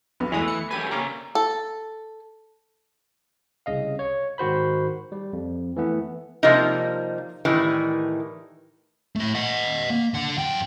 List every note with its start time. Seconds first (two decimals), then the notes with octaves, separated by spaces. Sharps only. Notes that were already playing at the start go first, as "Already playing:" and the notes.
0.20 B1 B3
0.32 E2 E3 G#3 A3 D#6 F7
0.48 C#7
0.71 F#2 G4 B4 G#5 D#7
0.91 C#3 G3 A#3 C#4 A#5
1.35 A4
3.66 C2 C#3 D#5 F5
3.99 C#5
4.38 G#2 D#3 F#4 C5 B5
5.12 G3
5.33 F2
5.76 E3 A3 B3
6.43 C3 F3 G3 A#3 D#4
7.45 A2 D#3 E3 G3
9.16 A3 E4
9.34 D#5 F#5
9.90 A#3
10.14 D3 F#5
10.37 F#2 G5